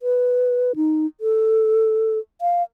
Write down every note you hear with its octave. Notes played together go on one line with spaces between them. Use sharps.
B4
D#4
A4
F5